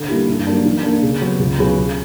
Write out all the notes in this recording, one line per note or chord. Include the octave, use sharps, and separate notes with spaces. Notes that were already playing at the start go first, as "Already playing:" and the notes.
Already playing: D3
G3 A#3 E4 G4
G2
F#3 A#3 D4
E3
A#3 D4
C#3
F#3 B3
C#2
C#3 F#3 B3
C#3